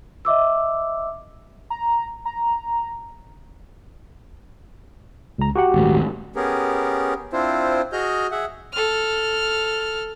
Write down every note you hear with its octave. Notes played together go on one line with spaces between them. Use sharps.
D#5 E5 D6 E6
A#5
A#5
C#2 A#5
F#4 G4 F#5
D#1 G#1 A3
B3 C#4 G4 G#4 A#4
C4 D4 E4 F4 C5
F#4 G#4 D#5 F6 G6
G#4 E5 F#5
A4 F6